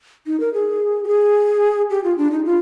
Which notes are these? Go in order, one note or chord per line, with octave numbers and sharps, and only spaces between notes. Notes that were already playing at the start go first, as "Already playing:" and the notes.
D#4
A#4
G#4
G4
G#4
G4
F4
D4
D#4
F4